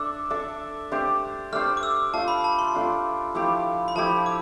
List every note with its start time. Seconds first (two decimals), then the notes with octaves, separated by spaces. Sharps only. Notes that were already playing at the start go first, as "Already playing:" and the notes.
Already playing: D4 A4 E5 E6
0.30 D4 A4 E5
0.91 A3 D4 G4 C5
1.52 A3 D4 G4 C5 F6
1.77 D6
1.83 E6
2.13 A3 D4 F4 A5
2.28 B5
2.44 A5
2.59 C6
2.75 A3 D4 F4
3.35 F3 A3 E4 G4
3.88 B5
3.95 F3 A3 E4 G4 A5
4.26 D6